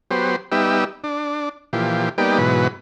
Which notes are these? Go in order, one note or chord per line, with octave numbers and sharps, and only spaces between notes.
F#3 B3 G4 C5
G3 B3 D#4 G4 E5
D4
A#2 E3 F3 G4
G3 A#3 B3 D#4 G4 D5
G#2 B2 E3 F#3 B4